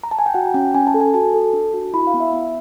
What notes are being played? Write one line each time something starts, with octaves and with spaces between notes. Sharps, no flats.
A#5
A5
G#5
G5
F#4 F#5
C#4 G5
C#4 G#5
A5
A4
G#5
F#4 A5
A4
D4
F#4
E4 B5
F5
B3
E5
B3